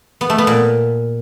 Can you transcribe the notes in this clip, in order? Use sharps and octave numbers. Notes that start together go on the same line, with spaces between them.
B3
A3
B3
A#2